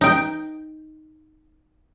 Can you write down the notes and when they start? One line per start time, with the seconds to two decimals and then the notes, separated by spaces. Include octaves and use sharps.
0.01 D#4 G5